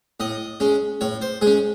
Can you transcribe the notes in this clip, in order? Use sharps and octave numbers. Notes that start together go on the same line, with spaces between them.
A2 D#5
G#3 C#4
A2 C#5
C5
G#3 G#4
C#4